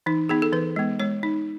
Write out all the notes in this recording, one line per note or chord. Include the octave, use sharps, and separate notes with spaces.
E3 D#4
B3 D#4 G#4
A4
E3 B4
G#3 B3
G#3 C#5
D#4